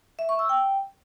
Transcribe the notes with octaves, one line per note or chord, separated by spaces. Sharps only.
E5
C#6
E6
G5